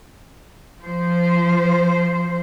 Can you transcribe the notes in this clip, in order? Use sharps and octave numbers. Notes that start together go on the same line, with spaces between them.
F3 C5